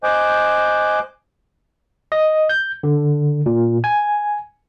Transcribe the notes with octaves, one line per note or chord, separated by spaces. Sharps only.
C5 D#5 G#5 D6 F#6 G6
D#5
G6
D3
A#2
G#5